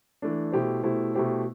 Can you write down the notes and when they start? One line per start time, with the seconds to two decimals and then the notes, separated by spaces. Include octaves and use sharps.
0.22 E3 A3 D4
0.52 B2 A3 E4 G4 C5
0.83 B2 A3 E4 G4 C5
1.15 B2 A3 E4 G4 C5